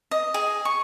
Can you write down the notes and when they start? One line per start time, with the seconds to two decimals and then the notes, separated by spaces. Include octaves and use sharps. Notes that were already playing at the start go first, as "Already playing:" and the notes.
0.11 D#5
0.34 G#4
0.65 C#6